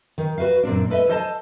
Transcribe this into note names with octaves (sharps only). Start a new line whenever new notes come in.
D#3
F#4 B4 E5 F5
F#2 A#2 C4 D4
A4 B4 D#5 E5
A4 C5 D#5 G#5 A5